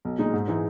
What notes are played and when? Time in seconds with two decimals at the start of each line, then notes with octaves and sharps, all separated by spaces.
0.05 B1
0.19 A#2 G#3 D#4
0.33 G#2
0.48 E3 G#3 D#4